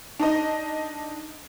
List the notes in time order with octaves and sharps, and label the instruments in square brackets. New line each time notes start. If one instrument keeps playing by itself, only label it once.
[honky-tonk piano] D4 D#4 D#5